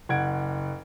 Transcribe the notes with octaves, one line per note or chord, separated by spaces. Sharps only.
F#1 F#5 G#6 D7